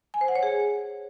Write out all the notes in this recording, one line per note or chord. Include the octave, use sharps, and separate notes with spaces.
G#5
C5
F#5
C#5
G#4